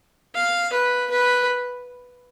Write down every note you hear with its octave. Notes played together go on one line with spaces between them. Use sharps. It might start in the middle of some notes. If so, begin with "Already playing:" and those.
F5
B4
B4